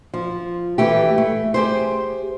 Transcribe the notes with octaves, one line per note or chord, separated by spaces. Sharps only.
F3
E3 A3 G4
A3
G4 G#4 C5